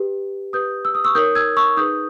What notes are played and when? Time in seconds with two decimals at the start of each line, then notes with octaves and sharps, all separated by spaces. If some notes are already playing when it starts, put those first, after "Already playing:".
Already playing: G4 B4
0.53 G4 B4 D#6 G6
0.85 E6
0.95 D#6
1.05 C#6 E6
1.15 D#4 A#4 C#5 D#6 G6
1.35 E6 G#6
1.57 C#6 E6
1.77 D#4 G#4 B4 D#6 G6